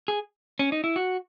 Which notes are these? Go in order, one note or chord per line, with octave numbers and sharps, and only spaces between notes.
G#4
C#4
D#4
E4
F#4